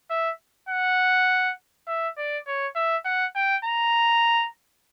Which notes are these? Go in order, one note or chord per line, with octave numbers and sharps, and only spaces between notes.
E5
F#5
E5
D5
C#5
E5
F#5
G5
A#5